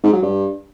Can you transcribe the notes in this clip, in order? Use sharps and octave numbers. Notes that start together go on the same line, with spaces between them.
G#2
F#3
G2